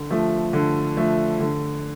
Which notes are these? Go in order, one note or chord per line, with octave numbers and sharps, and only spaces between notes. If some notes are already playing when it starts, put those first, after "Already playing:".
Already playing: D3
F3 A3
D3
F3 A3
D3